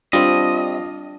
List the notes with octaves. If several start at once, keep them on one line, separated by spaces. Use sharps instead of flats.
G3 C4 D4 F4 D#5